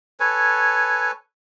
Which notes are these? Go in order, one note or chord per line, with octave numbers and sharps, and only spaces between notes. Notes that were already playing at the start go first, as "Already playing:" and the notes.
A4 B4 C#5 G#5